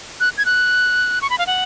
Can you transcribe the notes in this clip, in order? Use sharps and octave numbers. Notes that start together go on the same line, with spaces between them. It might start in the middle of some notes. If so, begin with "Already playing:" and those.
F#6
G#6
F#6
C#6
B5
F5
F#5